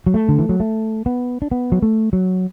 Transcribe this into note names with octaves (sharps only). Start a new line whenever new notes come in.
F#3
A3
D3
E3
F#3
A3
B3
D4
B3
F#3
A3
F#3